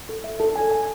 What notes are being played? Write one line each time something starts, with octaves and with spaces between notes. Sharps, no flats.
A4
E5
A4
G#5
G#5